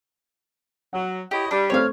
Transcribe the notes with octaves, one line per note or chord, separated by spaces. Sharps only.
F#3 F#5
E4 G4 C#5 D#5
G3 D4
A3 C4 C5 C#5 F5